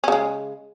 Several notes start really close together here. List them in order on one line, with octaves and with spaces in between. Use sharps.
C#4 C#3 G#3